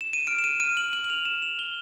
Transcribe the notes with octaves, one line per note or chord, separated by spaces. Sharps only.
E7
D#7
F6 D7
E7
D#7
F6 D#7
F#7
F6 F#7
F#7
F7
F6 E7
F7
F6 G7